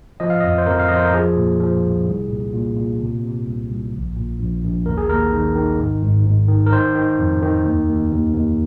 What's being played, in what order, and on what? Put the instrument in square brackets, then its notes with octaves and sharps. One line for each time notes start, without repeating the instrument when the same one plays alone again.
[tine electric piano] F3 D#5
F5
D#5
F2
C5
F2 A#4
F5
F3 D#5
C5
A#4
F3 G#4
A#2
F3
C2
C2
A#2
A#2
A#2
C3
C3
C2
C2
A#1
A#2
A#1
A#1
D#2 A#4
G#4
D#2 A#4
D#3
D#3
G#1
G#2
G#2
D#3
A#4
D#3 C5
D#3
F2
D#3
D#2
D#2
D#2
D#2